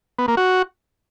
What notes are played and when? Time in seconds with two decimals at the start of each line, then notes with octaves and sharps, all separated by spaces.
0.19 B3
0.28 A#3
0.37 F#4